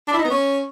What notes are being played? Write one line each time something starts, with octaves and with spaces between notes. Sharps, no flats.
D4
E4
D#4
B3
C#4